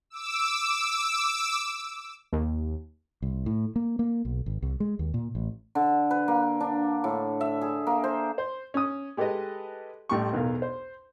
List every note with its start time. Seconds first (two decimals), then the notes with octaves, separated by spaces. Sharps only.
0.10 D6 E6
2.33 D#2
3.22 C2
3.46 A2
3.76 A#3
3.99 A#3
4.25 B1
4.46 G#1
4.62 C2
4.80 G#3
4.99 D#2
5.14 A#2
5.35 A1
5.75 D3
6.11 B4
6.28 A#3
6.61 D4
7.04 A2
7.41 E5
7.61 G#4
7.87 A#3
8.04 C5
8.38 C5
8.74 C#4 D#6
9.17 G#3 G4 A4 B4 D#5
10.09 A1 A2 G3 C6 C#6
10.33 B1 E2 A#4 F5
10.62 C5